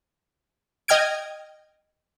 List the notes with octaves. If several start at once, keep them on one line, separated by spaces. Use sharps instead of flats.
D#5 G5 F6 G#6 D7